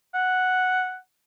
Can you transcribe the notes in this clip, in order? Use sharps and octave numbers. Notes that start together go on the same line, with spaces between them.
F#5